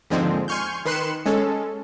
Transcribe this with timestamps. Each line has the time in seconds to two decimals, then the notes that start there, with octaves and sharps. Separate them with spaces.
0.10 D#2 G#2 D3 F3 G#3 C4
0.48 G#5 C6 C#6 F6 G6
0.86 D#3 B4 C6 F#6 C#7 E7
1.25 G#3 C#4 A4